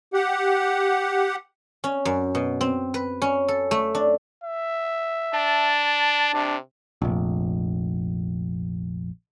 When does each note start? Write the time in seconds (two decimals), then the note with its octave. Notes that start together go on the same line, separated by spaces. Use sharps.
0.14 G4 F#5
1.84 C#4
2.05 F#2
2.35 B2
2.61 C4
2.94 B4
3.22 C#4
3.48 A4
3.71 A3
3.95 D4
4.44 E5
5.34 D4 A5
6.34 C3 D4
7.02 F1 A#1